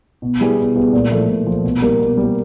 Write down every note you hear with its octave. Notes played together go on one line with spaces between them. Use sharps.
B2
G3 B3 E4 G#4
B2
G3 B3 E4 G#4
A#2
F3 A3
A#2
F3 A3
B2
G3 A#3
B2
G3 A#3